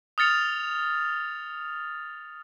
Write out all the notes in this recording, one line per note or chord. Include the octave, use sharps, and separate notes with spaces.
D#6 F6 A6 C#7 F7